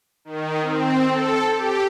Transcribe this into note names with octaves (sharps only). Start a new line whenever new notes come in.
D#3
C4
A4
G4